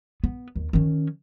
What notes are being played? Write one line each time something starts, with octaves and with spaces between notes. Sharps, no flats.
B3
D#2
D#3 C#4